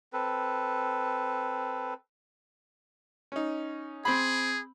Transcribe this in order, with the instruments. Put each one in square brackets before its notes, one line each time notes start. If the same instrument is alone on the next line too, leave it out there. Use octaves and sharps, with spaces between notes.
[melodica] C4 A4 B4
[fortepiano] C#4 D#4
[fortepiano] C4 B5 [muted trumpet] G#4